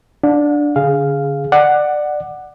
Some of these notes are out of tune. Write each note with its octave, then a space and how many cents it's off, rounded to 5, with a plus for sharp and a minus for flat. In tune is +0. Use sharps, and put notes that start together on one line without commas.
D4 +0 F#5 -45
D3 -25 G#4 +0 F5 +0
D5 +20 F#5 +0